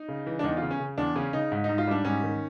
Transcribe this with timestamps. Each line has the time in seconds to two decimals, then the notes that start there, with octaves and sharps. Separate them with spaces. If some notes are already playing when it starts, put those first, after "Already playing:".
Already playing: D#4
0.08 C#3
0.27 E3
0.39 D4
0.44 E2 D#4
0.57 C#3 F4
0.71 C#4
0.80 C#3
0.98 E2 D4
1.15 C#3 C#4
1.33 C#3 D#4
1.52 G#2
1.64 G#2 D#4
1.78 F4
1.87 G3 D4
2.05 G#2 C#4
2.23 D#3